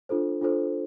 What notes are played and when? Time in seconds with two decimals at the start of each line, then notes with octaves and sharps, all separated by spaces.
0.09 D4 F4 A4 C5
0.41 D4 F4 A4 C5